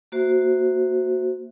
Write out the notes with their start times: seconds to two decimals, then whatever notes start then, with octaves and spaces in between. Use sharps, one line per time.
0.12 A#3 F#4 C5 E5